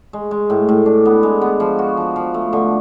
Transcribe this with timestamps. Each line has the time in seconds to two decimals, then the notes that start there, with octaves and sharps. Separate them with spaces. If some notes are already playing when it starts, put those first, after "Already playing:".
0.13 G#3
0.31 G#3
0.50 A2
0.69 A2
0.86 D4
1.06 B3
1.23 G#3
1.41 B3
1.60 F3
1.79 F#4
1.97 F3
2.16 F3
2.34 A3
2.53 D3